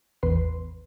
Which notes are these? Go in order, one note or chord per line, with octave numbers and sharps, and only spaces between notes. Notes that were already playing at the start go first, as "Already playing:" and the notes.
A1 E2 B4 C6